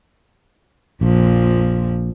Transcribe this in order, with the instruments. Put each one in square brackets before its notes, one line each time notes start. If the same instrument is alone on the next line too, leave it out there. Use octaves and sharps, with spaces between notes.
[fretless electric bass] A#1 [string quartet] F2 A#2 F3